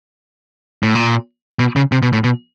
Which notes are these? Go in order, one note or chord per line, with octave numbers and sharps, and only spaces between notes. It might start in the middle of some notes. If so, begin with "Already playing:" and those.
A2
A#2
B2
C#3
C3
B2
A2
B2